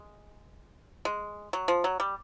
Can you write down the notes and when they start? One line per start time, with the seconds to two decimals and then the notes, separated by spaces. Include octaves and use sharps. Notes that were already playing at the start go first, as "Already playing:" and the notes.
Already playing: G#3
1.05 G#3
1.53 F#3
1.68 F3
1.84 F#3
2.00 G3